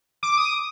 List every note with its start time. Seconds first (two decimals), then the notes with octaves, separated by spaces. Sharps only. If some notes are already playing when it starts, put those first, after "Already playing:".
0.23 D6
0.38 D#6